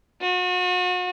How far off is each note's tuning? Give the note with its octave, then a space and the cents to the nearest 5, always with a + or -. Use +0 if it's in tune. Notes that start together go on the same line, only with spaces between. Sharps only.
F#4 -40